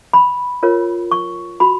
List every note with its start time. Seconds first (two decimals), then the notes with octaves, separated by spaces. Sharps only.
0.13 B5
0.63 F4 A#4 C#5
1.11 C#6
1.60 F#4 B5